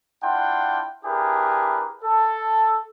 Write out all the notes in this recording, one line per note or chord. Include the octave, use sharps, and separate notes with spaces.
D4 E4 F4 F#5 G5 C6
D4 E4 G4 G#4 A#4 B4
A4